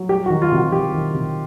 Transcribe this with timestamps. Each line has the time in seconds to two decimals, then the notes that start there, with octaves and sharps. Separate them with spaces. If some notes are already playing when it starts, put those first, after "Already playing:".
Already playing: F#3
0.09 G3 G4
0.26 F#4
0.30 D#3
0.42 F4
0.52 C3
0.57 F#4
0.72 D#3 G4
0.94 D#3
1.14 C3